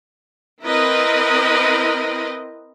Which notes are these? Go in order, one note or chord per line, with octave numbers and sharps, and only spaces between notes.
C4 E4 A#4 B4 D#5